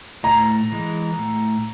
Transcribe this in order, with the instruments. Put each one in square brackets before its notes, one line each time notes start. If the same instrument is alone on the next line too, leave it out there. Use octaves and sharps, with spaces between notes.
[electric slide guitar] A2 [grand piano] A#5
[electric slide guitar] E3 G#3
A2